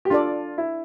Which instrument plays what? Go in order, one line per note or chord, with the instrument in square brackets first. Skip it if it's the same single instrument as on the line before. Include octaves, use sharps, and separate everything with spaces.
[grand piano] G4
[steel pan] D4 A4 D5 [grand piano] F4
[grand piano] E4